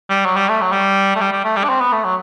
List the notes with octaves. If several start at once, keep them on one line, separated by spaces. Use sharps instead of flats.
G3
F#3
G3
A3
F#3
G3
A3
G3
G3
A3
G3
D4
C4
B3
A3
F#3